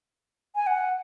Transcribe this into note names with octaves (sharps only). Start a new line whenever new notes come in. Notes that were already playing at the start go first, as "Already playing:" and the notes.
G#5
F#5